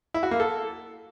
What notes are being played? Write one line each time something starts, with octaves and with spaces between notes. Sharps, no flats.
E4
F#4
A#3
A4